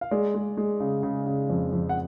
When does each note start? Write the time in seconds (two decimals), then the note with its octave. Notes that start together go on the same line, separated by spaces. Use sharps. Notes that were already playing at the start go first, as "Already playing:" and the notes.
0.01 F5
0.11 G#3 D5
0.35 G#3
0.57 G#3
0.80 C#3
1.03 C#3
1.26 C#3
1.49 F2
1.72 F2
1.89 F#5